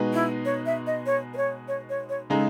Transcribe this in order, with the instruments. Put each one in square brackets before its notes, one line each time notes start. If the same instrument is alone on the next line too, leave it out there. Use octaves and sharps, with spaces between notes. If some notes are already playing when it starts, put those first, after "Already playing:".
Already playing: [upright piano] B2 G#3 D#4 F#4 B4
[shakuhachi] E4
C#5
E5
D#5
C#5
B4
C#5
C#5
C#5
C#5
[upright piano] C#3 G#3 D#4 [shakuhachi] A4